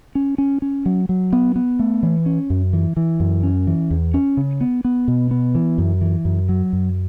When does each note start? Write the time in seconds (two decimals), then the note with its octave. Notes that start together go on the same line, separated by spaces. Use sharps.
0.15 C#4
0.38 C#4
0.62 C#4
0.86 F#3
1.09 F#3
1.33 B3
1.56 B3
1.79 A3
2.03 E3
2.26 C#4
2.50 F#2
2.73 E3
2.97 E3
3.20 F#2
3.43 C#4
3.67 E3
3.91 E2
4.14 C#4
4.37 C#3
4.61 B3
4.85 B3
5.08 B2
5.31 B3
5.55 E3
5.78 F#2
6.01 E3
6.25 F#2
6.49 F#3
6.73 F#2